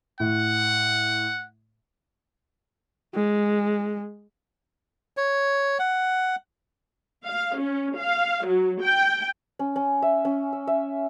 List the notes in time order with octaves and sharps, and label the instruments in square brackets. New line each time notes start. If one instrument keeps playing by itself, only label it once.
[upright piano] A2 [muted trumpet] F#5
[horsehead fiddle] G#3
[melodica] C#5
F#5
[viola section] F5
C#4
F5
F#3
G5
[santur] C#4
C#4
E5
C#4
E6
E5